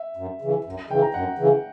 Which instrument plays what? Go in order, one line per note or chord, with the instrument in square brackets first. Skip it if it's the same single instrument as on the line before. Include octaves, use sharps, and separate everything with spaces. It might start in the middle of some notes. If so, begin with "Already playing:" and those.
Already playing: [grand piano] E5
[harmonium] F#2
C#3 E3
F#2
[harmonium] C#3 E3 [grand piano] G5
[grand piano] A#5
[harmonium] F#2 [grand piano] F#5
[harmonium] C#3 E3